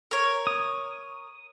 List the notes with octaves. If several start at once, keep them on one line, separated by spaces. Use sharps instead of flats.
A#4 C#5
D#6